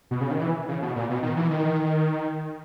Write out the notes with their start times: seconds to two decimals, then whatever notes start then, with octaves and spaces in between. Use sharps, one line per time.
0.11 B2
0.21 C#3
0.31 D#3
0.41 E3
0.69 C#3
0.82 B2
0.96 A#2
1.10 B2
1.22 D#3
1.36 E3
1.50 D#3